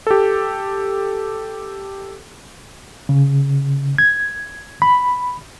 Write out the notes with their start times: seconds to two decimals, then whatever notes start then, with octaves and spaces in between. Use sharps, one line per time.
0.07 G4 A4
3.09 C#3
3.98 G#6
4.82 B5